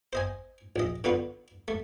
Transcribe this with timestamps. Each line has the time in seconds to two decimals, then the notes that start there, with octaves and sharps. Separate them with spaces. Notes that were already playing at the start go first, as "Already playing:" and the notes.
0.13 C5 D#5 G#5
0.76 A#1 D#5
1.04 D3 B3 F4 B4
1.68 A3